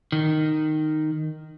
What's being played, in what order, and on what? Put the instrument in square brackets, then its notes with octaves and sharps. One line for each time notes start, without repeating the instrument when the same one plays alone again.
[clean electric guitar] D#3